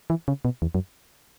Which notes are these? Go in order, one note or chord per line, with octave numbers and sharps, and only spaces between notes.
E3
C#3
B2
E2
F#2